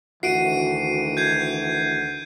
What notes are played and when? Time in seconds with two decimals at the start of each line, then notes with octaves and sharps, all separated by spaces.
0.23 D2 D#3 E3 F#4 C7 D7 D#7
1.17 G6 G#6 C7